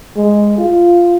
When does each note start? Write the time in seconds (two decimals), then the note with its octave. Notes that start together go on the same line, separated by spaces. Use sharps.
0.16 G#3
0.58 F4